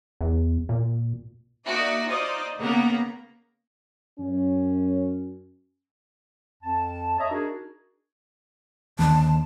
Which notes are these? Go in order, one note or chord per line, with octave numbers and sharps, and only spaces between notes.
E2
A#2
A#3 D#4 F#4 D5 E5
D#4 F4 C5 D5 D#5
C#3 A#3 B3 F#5 A#5
F#2 C#4
F2 A5
C#5 D#5 E5 A#5 D#6
D4 D#4 F#4 G#4 A#4
D#2 D3 A5